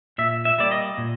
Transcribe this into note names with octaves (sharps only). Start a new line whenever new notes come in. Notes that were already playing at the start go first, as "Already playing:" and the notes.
A#2 E5
E5
G3 A#3 D5
D#5
A#2